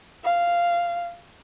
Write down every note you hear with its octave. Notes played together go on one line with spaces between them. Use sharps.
F5